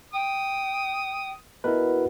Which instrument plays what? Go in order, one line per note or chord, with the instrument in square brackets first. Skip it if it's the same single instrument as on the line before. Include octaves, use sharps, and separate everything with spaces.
[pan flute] G5 [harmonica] D#6
[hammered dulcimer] B2 [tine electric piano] E4 A#4 B4